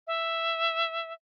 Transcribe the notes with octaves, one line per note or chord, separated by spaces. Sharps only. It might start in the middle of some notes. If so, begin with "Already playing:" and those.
E5